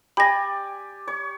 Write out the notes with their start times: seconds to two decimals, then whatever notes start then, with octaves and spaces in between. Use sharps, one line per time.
0.17 G4 D5 G#5 B5 A#6
1.08 C#5